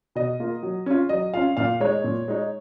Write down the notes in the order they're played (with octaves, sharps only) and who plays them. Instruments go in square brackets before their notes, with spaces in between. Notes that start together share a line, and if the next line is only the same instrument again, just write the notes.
[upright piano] B2 D#5
A#3 F4
F#3
C#4 F4
F#3 D#5
C#4 F4 F5
A#2 F5
G#3 D#4 C#5
A#2
G#3 D#4